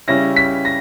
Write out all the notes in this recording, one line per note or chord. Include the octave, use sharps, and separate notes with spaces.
C#3 G3 C#4 E4 A#6
B6
A#6